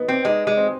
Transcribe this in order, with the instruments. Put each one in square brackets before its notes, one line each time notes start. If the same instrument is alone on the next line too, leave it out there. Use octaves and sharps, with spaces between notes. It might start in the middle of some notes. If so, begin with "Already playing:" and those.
Already playing: [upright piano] B3 D#4
[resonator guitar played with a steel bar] C4
[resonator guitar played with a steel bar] G#3 [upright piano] D#4
[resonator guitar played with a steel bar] G#3
[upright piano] C4